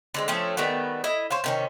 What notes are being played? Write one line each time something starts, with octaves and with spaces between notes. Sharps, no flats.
D3 G#3 C4
F3 A3 C4 C#4
D#3 G3 A3 B3
E4 D#5
C5 C#5 F5
C3 D#3 C#4